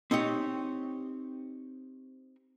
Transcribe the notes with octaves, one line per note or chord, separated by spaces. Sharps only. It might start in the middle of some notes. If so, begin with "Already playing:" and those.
C4 D#4 G4 C#5